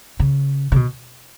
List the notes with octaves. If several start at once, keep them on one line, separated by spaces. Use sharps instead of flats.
C#3
C#3
B2